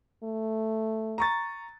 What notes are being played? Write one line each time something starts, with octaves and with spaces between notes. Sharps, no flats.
A3
A#5 C#6 A6